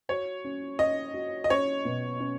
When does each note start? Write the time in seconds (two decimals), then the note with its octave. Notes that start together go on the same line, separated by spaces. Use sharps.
0.09 F#4 C#5
0.44 C#4
0.79 C#4 D#5
1.14 F#4
1.44 D#5
1.50 C#4 C#5
1.85 B2
2.20 C#4